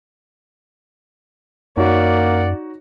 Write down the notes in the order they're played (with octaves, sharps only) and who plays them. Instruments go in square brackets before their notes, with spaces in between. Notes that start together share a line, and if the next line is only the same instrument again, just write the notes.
[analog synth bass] F#2 [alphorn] A#3 [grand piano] D#4 F#4 C#5 [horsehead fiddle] D5 F#5